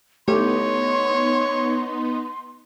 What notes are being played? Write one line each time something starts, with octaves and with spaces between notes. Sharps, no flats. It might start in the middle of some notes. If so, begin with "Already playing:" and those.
A3 B3 D#4 G4 C#5 C6